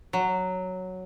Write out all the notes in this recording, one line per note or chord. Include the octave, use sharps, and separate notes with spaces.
F#3